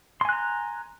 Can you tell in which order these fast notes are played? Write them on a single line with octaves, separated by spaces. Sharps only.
C6 G#5 F#6 A#5